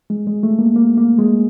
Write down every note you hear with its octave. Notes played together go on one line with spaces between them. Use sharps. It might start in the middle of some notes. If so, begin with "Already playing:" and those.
G#3
G#3
A3
A#3
A#3
A#3
G#3